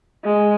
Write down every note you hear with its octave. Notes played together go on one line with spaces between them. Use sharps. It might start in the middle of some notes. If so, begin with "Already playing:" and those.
G#3